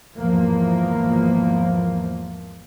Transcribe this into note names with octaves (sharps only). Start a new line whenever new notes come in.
G#1 E2 F3 A#3